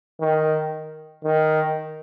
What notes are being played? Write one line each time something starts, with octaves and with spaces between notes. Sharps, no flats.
D#3
D#3